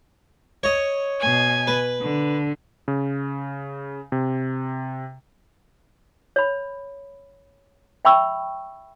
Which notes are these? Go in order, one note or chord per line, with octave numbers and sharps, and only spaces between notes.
C#5 D#5
B2 G#5
B4
D3
C#3
C3
C#5 B5
E5 G5 B5 C#6 E6